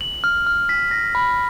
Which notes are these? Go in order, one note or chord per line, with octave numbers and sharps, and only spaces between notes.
F#7
F6
F6
B6
A#6
B5